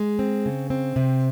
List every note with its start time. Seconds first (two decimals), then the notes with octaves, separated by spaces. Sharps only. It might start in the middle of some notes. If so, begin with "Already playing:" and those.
Already playing: G#3
0.19 C4
0.46 C#3
0.70 C4
0.96 C3